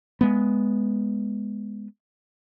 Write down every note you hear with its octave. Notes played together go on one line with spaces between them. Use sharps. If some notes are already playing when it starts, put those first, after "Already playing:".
G#3 B3